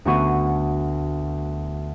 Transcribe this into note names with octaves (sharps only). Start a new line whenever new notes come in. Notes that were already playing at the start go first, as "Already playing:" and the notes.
D2 A3 B3 F#4 C#6 D#7